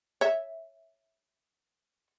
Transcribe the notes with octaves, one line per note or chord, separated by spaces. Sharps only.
C#5 E5